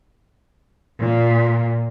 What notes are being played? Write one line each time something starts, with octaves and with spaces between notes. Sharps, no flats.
A#2